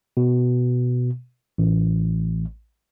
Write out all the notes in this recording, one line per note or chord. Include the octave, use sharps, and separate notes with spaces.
B2
A1